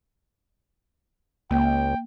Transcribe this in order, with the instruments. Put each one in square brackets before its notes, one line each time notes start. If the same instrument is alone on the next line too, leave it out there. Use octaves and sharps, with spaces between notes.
[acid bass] C#2 [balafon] A#3 [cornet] G5